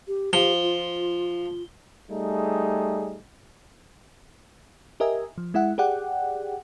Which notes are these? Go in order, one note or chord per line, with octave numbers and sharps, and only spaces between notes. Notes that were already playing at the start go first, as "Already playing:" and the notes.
G4
F3 G4 G7
F4
G3 A3 D#4 G#4
G4 A#4 D#5 E5 G#5
F3
G#3 E4 E5 F#5
G4 G#4 D5 F#5 G5